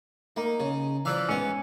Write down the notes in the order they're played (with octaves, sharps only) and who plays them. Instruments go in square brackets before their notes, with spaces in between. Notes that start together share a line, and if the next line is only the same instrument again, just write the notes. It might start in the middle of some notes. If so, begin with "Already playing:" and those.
[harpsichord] A#3 [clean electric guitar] D#4
[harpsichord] C#3
[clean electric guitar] E3 [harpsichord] F3 D5 F5
[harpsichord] G#2 B3 [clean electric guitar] C#4